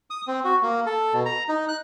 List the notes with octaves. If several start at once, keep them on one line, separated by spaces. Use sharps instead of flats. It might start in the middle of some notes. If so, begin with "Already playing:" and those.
D#6
C4
F#4
A#3
A4
B2
A#5
D#4
F#6